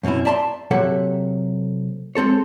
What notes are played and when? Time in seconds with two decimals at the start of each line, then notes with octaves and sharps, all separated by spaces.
0.03 F#2 B2 C4 C#4 E4
0.25 D5 E5 A5 A#5 C6
0.71 C3 F#3 A#3 A4 E5 F#5
2.15 G#3 C4 A4 C#5